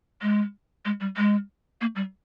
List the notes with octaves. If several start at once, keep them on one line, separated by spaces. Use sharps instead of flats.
G#3
G#3
G3
G#3
A#3
G3